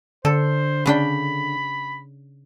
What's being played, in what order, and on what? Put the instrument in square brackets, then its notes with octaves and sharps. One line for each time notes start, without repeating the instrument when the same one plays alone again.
[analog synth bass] D3 [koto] A4 [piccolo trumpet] C5
[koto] C#3 D4 G5 [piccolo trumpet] B5